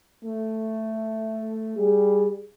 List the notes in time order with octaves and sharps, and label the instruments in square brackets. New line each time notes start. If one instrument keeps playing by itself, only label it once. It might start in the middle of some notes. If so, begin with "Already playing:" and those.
[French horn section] A3
[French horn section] G3 [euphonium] G#4